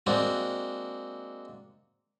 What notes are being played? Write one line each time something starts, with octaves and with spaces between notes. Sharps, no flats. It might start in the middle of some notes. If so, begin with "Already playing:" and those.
G#3 A#3 C4 D4 F#4